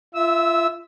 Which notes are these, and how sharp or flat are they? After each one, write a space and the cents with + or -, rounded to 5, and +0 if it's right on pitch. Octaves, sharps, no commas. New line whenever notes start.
F4 -30 E5 +0 E6 -15